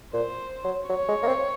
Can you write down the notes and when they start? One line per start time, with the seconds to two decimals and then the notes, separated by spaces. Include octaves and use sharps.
0.13 A#2 C5
0.64 F#3
0.89 F#3 C#5
1.08 G#3
1.23 A#3
1.27 C4